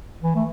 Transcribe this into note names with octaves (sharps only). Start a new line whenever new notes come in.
E3
A3